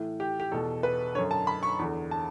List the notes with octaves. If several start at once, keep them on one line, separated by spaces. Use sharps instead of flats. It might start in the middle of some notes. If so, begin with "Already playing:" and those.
Already playing: A2 E3
G4
G4
E2 B2 A4
B4
F#2 D3 C#5
A5
B5
C#6
E2 D3
A5